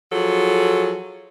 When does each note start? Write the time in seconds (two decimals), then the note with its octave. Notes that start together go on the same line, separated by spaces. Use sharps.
0.12 F3 F#3 G#4 A4